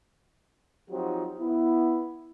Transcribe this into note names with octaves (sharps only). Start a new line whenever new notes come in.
F3 F#3 C4 D#4 F#4 G4
B3 E4